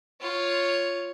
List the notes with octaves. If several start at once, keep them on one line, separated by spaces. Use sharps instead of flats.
F4 C#5